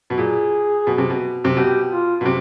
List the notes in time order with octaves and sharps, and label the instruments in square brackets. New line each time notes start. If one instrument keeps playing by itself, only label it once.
[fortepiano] B2
[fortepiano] A#2 [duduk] G#4
[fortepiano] B2
C3
B2
C3
[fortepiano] B2 [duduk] G4
[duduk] F4
[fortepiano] B2
C3